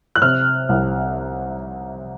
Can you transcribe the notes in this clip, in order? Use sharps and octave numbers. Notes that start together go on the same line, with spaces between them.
F#6
C3 F6
C2